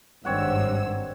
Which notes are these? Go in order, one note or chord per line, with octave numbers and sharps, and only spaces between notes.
G#1 G2 C4 C#5 F#5 E6